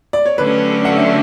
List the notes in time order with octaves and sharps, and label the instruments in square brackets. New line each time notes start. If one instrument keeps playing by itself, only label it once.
[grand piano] D5
C#5
[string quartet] D3 F#3 A3 C#4 G4 [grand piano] B4
[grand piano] F#5
E5